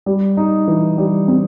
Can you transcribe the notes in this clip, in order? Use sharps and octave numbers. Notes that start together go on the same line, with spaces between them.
G3
D#4
E3
G3
C4